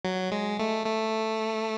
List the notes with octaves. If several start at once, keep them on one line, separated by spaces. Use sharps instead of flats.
F#3
G#3
A3
A3